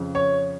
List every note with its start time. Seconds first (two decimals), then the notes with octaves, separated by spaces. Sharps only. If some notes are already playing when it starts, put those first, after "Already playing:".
Already playing: F2 C#3
0.15 C#5